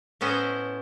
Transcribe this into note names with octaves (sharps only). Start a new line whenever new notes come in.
A2 B3 C#4 E4 C5 D#5